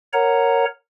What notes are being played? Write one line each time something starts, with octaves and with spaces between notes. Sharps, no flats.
A#4 C#5 F#5 A#5